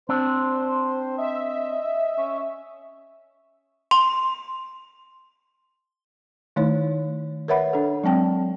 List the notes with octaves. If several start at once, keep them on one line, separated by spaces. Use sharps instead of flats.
C4 D4 C5
D#5 E5
C#4
C6
D#3 A3 D#4 E4 C#5
A#4 B4 C#5 E5 F#5 B5
D4 A4
F#3 G#3 C4 G5